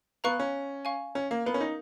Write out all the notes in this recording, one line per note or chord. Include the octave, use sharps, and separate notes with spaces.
B3 F5 A#5 C#6 F#6
C#4
F5 G#5 C#6
C#4
A#3
B3 A#4 F5 A#5
C#4
D#4